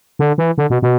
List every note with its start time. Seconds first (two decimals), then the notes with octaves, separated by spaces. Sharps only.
0.19 D3
0.38 E3
0.58 D3
0.70 B2
0.82 B2